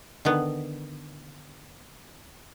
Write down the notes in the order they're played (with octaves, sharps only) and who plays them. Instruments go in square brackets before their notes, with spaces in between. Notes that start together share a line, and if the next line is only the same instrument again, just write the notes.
[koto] D3 D#3 B3